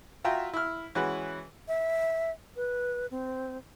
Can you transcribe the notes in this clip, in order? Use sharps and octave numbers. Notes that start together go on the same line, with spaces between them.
F4 F#4 E5 G5 A#5
E4 F6
E3 G#3 C#4 F#4 B4
E5
B4
C4